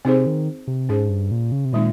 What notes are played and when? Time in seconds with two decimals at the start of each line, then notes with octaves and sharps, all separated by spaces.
0.05 C3 C4 D#4 G#4 C5
0.26 D#3
0.67 C3
0.89 G#2 C#4 G#4 C5
1.09 G2
1.31 A#2
1.52 C#3
1.65 C3
1.73 A#2 D#3 G#3 C4 D#4